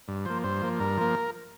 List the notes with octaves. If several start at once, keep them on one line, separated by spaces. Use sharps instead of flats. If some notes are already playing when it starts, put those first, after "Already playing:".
G2
F3 A#3 C5
G2 C5
F3 A#3
G2 A#4
F3 A#3